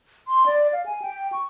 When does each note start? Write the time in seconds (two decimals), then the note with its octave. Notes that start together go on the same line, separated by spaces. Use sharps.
0.28 C6
0.46 D5
0.73 F5
0.86 G#5
1.02 G5
1.32 C#6